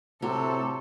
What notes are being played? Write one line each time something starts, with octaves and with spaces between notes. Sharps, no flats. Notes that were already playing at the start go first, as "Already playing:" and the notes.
A2 C3 F#3 A4